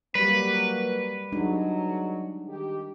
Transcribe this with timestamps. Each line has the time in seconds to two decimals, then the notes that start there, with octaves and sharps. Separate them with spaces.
0.15 F#3 G3 A#3 G4 B4
1.32 F#3 G#3 D4 D#4
2.48 D#3 G4